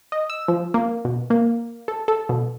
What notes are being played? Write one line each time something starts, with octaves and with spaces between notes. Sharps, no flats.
D#5
E6
F3
A#3
B2
A#3
A4
A4
B2